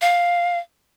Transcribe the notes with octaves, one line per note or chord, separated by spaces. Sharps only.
F5